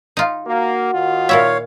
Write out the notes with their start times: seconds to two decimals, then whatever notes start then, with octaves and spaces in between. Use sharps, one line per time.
0.17 D#4 F4
0.47 A#3 F#4
0.94 D#2 D#3 F4
1.29 A#2 E4 C#5 E5 F5